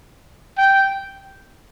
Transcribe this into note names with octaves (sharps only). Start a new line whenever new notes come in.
G5